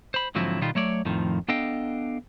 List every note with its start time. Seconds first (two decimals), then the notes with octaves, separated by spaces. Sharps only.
0.14 C5 B5
0.35 G#2 D3 F3 F#3 C4 E4
0.62 B2 D#3 G3 B3 F4
0.75 F#3 A3 C#5 D5
1.05 F2 A2 D#3 F3
1.48 B3 D4 A4 D#5 F5 G5